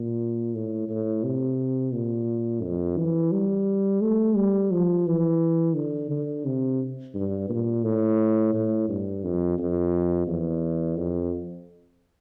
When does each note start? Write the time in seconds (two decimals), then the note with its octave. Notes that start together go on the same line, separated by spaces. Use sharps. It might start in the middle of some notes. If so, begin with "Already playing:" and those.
Already playing: A#2
0.54 A2
0.89 A2
1.24 C3
1.93 A#2
2.63 F2
2.97 E3
3.32 G3
4.01 A3
4.36 G3
4.71 F3
5.06 E3
5.75 D3
6.10 D3
6.45 C3
7.14 G2
7.50 A#2
7.84 A2
8.54 A2
8.89 G2
9.24 F2
9.59 F2
10.27 E2
10.97 F2